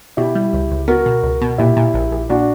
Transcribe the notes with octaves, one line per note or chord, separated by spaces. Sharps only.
B2 E4 G4
G3
C#2
C#2
B3 F#4 A#4
B2
C#2
B2
A#2 E4 G4
A#2
A#1
A#1
A#2 D4 F#4